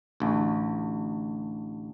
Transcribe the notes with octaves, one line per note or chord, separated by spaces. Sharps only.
A1 D2